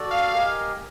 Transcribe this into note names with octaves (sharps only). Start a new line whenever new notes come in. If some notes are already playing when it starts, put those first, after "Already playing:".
Already playing: F#4 A4 D5
F5
G4 A#4 D#5 G#5